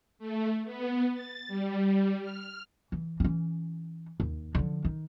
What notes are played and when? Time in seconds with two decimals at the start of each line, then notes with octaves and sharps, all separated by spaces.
0.19 A3
0.65 B3
1.14 A6
1.48 G3
2.22 F6
2.92 E3
3.20 E3 C#4
4.20 D#2
4.55 D3 F3
4.85 D#3